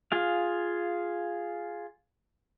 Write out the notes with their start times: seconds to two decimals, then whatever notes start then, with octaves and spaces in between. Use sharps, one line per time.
0.12 F4 G#4 F5